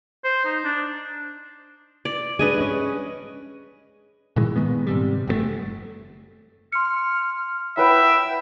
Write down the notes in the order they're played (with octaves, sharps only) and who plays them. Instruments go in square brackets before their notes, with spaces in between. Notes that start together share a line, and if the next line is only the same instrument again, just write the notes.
[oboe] C5
D#4
D4
[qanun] D5
[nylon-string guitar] G#3 D4 [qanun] B4 D#5 G#5
[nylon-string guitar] G#3 C#4
[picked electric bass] A#2 D#3 E3 G#3
A#2 D#3 G#3 B3
G#2 C3 G3
F#1 B2 A3
[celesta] C6 C#7 [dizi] F6
[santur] E4 B4 F#5 [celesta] C#5 B5 [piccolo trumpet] E5 [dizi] G5